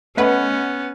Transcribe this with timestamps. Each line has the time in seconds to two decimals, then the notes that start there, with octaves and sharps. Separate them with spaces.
0.17 A3 B3 C#4 B4 D#5 F#5 B5